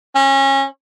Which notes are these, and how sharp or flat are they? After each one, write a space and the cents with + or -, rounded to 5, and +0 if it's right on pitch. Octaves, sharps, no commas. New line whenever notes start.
C#4 -25